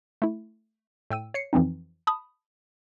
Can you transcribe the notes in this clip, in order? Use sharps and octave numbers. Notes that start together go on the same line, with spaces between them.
A3 E4
A2 G5 E6 D#7
C#5 C7 C#7
F2 E3 F3 C4 D#4
A5 B5 D#6